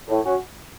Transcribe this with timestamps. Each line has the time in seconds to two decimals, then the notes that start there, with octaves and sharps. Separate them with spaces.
0.08 A2
0.25 F#3 C#4 F#4